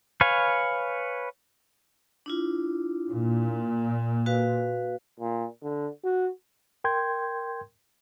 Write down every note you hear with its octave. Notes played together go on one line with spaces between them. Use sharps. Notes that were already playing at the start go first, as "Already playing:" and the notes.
B4 C#5 F5 G#5
D4 E4 F4
A#2
F#4 B4 F5
A#2
D3
F#4
A#4 G5 C6 G6 G#6